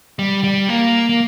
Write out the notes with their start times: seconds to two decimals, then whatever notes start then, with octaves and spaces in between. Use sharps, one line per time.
0.19 G3
0.44 G3
0.69 A#3
1.09 A#3